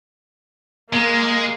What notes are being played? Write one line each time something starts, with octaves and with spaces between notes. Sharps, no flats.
G#3 A#3